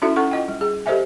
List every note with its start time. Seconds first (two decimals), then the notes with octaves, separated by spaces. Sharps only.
0.02 C#4 D#4 E4 F#4 A4 E5
0.16 C#4 A4 F#5 C#6
0.31 F4 D#5 G5
0.48 G3
0.61 G#4
0.86 G4 A4 C5 D#5 E5 G#5